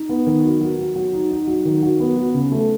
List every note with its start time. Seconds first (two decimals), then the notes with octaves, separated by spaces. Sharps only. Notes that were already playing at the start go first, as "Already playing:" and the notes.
Already playing: D#4
0.09 B3
0.27 D#3
0.44 F#3
0.61 F#3
0.78 F#3
0.96 F#3
1.13 D#4
1.31 D#4
1.47 F#3
1.65 D#3
1.83 F#3
2.00 B3
2.17 F#3
2.34 C#3
2.52 A3